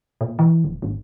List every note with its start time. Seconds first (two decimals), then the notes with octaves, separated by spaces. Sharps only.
0.21 A#2
0.39 E3
0.64 D1
0.82 G#1